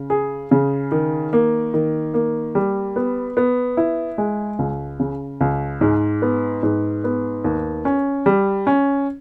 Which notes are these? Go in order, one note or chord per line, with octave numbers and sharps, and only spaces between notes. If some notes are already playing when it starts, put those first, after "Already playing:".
Already playing: C#3
G#4
C#3
D#3
A#3
D#3
A#3
G3
B3
B3
E4
G#3
C#2
C#3
C#2
G#2
B3
G#2
B3
D#2
C#4
G3
C#4